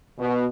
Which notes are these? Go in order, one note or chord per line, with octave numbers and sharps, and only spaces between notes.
B2